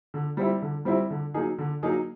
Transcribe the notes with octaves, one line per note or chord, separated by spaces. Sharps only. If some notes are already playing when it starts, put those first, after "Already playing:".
D3
G3 C4 E4
D3
G3 C4 E4
D3
F#3 A#3 D#4 G#4
D3
F#3 A#3 D#4 G#4